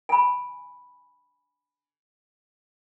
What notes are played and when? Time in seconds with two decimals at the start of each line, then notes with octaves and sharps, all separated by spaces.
0.09 G#5 B5